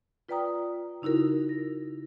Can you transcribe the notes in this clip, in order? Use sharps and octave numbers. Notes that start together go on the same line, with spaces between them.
F4 B4 D5 G5 A#5 D#6
C#3 D#4 E4 F#4 A#4
A#6